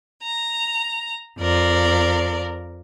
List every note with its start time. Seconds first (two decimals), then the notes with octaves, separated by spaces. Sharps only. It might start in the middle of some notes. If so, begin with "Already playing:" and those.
0.22 A#5
1.39 F2 A#4 D5